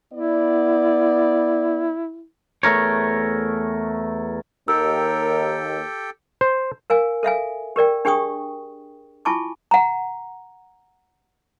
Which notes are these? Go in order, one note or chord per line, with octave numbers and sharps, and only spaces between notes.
B3 E4 D5
E2 A3 A#4 C#5
D#2 G4 A4 A#4 G5 E6
C5
A#4 F5 G#5
A4 E5 F5 G#5
G4 A#4 D5 G5
D4 G4 G#4 G5 C#6 D#6
E4 F4 G#5 A5 C#6 D6
F#5 A#5